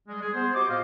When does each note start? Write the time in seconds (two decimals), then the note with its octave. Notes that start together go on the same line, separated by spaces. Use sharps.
0.08 G3 G#3
0.22 G#4
0.34 B3 C5
0.54 F#4 G4 C5 D#5 D6
0.69 A#2 D#5 F5